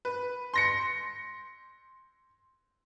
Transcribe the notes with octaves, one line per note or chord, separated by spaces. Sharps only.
B4
C6 A#6 C#7